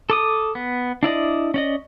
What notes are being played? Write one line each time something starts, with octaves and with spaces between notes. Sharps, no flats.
A4 D6 D#6
B3
D4 E4 D5 D#5
C#4 D5 D#5